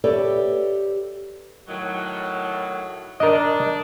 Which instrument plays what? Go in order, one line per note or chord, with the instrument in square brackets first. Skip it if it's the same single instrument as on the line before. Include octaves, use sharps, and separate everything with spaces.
[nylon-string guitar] G4 A4 B4 C#5 D5 E5
[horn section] A2 D#3 F#3
[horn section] D4 [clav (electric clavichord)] A#4 D#5